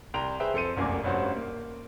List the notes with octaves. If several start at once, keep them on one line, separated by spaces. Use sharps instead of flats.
C2 G5 A#5 C6 F7
G#4 B4 C5 E5 G5
F2 A4 C5 C#7 D#7
F1 C2 F#2 A#3 G#5 D6
F1 G2 C#4 F#4 C5
A#3